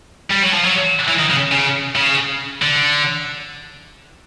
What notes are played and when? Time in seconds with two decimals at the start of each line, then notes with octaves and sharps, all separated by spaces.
0.31 G3
0.43 F#3
0.54 F3
0.65 F#3
1.08 E3
1.19 D#3
1.30 C#3
1.52 C#3
1.96 C#3
2.62 D3